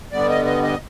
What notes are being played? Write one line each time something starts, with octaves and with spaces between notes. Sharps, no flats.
G2 D3 G3 B3 D5
D#5
D#5
D#5